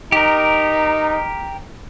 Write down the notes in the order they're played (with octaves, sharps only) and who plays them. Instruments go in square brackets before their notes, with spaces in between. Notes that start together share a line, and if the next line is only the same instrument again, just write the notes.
[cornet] D#4 [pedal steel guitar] G4 A#4